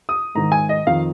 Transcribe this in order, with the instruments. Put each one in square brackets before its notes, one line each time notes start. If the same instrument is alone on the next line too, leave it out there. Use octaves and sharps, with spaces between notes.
[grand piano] D#6
G#2 D#3 A#5
G#5
D#5
F2 D#3 F5